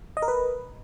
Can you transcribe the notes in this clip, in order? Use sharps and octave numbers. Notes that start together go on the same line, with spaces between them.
D#5
A#4
B4